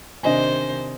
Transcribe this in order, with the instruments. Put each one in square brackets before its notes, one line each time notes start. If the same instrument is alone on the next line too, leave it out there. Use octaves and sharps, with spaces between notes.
[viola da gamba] C3 D#3 C5 [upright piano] D4 D#5 G#5